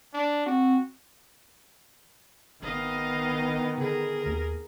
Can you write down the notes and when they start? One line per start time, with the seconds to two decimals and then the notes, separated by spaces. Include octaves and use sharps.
0.14 D4
0.46 C4 F#4
2.63 G#1 D#3 B3 D#5 F5
3.78 D3 G#4 A#4
4.26 D#2